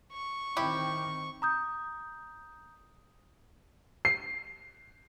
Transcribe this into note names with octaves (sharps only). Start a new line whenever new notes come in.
C#6
D#3 C4 E4 G4
A#5 D#6 G6
C7